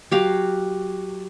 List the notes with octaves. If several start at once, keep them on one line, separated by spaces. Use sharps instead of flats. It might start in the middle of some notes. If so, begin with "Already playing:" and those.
F#3 G4 F5